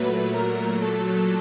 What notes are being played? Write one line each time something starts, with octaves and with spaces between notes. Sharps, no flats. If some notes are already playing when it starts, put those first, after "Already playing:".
Already playing: A#2 F#3 A3 B4
A#4
A4